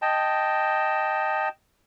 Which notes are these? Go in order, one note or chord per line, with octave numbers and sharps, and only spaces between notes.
D#5 G5 A5